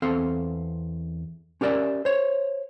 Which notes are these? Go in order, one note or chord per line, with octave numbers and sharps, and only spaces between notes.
E2 C4 A4 F5
C#4 G4 A#4 D5 E5
C5 C#5